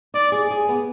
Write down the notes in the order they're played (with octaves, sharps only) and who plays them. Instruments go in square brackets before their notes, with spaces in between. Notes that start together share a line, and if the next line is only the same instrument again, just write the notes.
[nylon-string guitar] D#4 [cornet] D5
[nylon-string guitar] G#4
G#4
B3